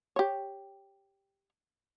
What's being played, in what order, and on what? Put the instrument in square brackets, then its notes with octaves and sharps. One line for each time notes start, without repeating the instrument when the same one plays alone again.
[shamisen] G4 C#5